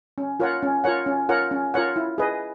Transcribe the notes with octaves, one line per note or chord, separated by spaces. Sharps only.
C#4
F4 A#4 C#5 F#5
C#4
F4 A#4 C#5 F#5
C#4
F4 A#4 C#5 F#5
C#4
F4 A#4 C#5 F#5
E4
G#4 B4 D#5